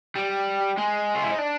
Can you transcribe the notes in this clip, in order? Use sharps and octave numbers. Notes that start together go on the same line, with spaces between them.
G3
G#3
F4
E4
D#4
D4